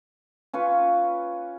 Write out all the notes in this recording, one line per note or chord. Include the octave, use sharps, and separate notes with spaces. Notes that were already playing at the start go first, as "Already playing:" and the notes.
C#4 F4 B4 C#6